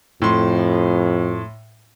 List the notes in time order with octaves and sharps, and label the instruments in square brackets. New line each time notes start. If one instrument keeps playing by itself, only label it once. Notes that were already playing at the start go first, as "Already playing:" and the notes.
[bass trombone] F2 [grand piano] A2 C6